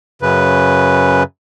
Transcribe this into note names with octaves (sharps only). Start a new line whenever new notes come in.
F#2 C#3 B4